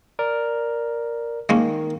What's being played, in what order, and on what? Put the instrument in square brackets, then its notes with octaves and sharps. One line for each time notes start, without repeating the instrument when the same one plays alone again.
[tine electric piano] A#4 D5
[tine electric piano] D#3 [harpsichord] G#3 A#3 C#4